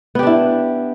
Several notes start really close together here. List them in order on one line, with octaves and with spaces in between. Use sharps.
B3 G4 D4 E4